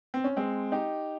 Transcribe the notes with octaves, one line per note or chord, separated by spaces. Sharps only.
C4
C#4
G#3 C4
D#4 G4